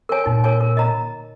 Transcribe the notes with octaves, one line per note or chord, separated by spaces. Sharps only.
A#4 C#5 G#5
A#2 D#4
A#4 C#5 G#5
A#4
D#5 A#5